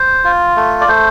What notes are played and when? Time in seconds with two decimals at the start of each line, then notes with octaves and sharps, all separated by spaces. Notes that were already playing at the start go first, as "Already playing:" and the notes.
Already playing: C5
0.24 F4
0.56 A3
0.81 D5
0.87 A3 C5